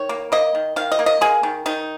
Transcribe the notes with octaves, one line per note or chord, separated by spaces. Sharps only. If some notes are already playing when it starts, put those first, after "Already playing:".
Already playing: D#3 C#5
A#3
A#3 D#5
D#3
D#3 F5
D#5
A#3
D#5
A#3 G#4
D#3
D#3 D#4